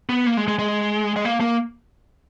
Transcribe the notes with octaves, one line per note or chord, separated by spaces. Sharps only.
B3
A#3
G#3
G#3
G#3
G#3
A#3
A#3